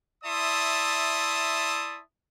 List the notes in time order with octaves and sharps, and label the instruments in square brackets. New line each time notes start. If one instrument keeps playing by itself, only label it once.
[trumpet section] E4 D5 E5 A5 C6 D#6